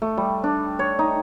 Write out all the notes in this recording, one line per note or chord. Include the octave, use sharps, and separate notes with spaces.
A3
G3
D4
C#5
D#4